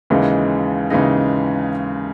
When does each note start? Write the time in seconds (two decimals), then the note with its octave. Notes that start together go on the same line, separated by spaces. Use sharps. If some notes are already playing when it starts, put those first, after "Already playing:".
0.10 D#2 C#3 E3 G#3 D#4
0.90 D#2 C#3 E3 G#3 D#4